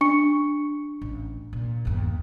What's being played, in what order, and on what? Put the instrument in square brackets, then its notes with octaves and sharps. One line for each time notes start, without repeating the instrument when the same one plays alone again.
[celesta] D4 C#6 C#7
[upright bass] A1
A#2
G1 D#2